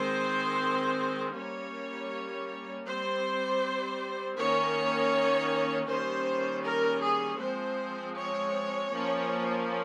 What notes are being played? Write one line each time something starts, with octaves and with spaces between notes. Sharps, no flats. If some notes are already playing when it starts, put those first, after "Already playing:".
Already playing: D#3 G#3 C4 C5
G3 A#3 C#4 C#5
G3 C4 C5
D#3 A#3 C#4 C#5
D#3 G3 A#3 C#4 C5
A#4
G#4
F3 G#3 C4 C5
C#5
F3 A#3 C#4